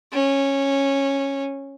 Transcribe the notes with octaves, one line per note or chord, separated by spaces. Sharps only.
C#4